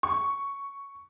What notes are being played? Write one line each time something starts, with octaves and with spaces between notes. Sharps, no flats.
C#6